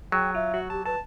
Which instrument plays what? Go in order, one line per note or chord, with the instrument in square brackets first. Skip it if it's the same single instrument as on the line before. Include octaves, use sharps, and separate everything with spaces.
[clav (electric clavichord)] F#3 [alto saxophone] G#4 [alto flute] G5
[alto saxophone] F4 [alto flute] E5
[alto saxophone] F#4
[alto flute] G4 [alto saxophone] A5
[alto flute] B4 [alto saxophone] A5